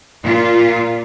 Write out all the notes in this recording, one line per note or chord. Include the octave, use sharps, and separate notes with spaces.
A#2 F4